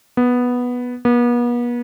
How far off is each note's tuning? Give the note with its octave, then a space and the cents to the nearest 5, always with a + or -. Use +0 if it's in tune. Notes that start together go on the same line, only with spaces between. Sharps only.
B3 -5
B3 -40